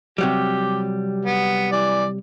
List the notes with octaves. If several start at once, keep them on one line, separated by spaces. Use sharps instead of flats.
C3 F#3 G3 G4
B3
E3 D5